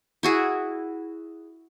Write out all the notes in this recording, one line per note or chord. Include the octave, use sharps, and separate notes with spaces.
E4 F#4 G#4